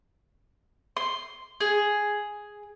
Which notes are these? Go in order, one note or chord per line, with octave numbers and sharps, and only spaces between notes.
C6
G#4